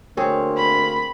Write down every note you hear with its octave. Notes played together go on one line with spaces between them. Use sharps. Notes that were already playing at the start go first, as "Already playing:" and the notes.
D2 A#3 C4 G#4 C#5
B5